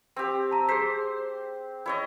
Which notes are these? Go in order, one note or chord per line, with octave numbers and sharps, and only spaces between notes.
C4 G4
A5 A#5
G#4 C5 B6
E4 C#5 D#5